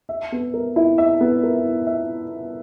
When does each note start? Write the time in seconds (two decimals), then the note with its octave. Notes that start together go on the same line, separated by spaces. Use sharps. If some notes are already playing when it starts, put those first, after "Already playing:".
0.09 E5
0.32 B3
0.54 A#4
0.76 E4
0.98 E5
1.21 B3
1.43 A#4
1.64 E4
1.87 E5